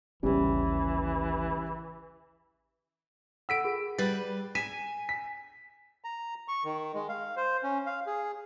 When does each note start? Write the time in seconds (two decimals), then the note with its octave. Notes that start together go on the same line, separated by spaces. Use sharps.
0.23 A1 D#2 C#3 E3 G3
3.49 A4 F#5 E6 B6 D7
3.64 F4 G#4 A#4
3.98 G3 B4 A6
4.55 G#5 B6 D#7 E7
5.09 B6
6.04 A#5
6.48 C#6
6.65 D#3
6.94 G#3
7.09 F5
7.37 C5
7.63 C#4
7.86 F5
8.07 G#4